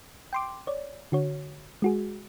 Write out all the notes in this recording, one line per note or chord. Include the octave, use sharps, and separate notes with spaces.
G5 C6 D6
C#5 D5
D3 F#4 C#5
G#3 F#4 G#4